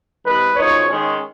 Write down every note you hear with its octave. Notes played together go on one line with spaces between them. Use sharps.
C3 E3 G#3 B4
F#2 C#3 F3 A#3 D#4 C#5
D#3 G#3 C#4